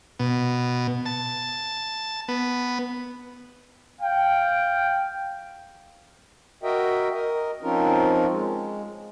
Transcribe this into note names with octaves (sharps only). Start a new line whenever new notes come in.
B2
A5
B3
F5 G5
F#4 A#4 D#5 E5 G5
A#4 D#5
F3 C4 C#4 D#4 F4 A#4
G#3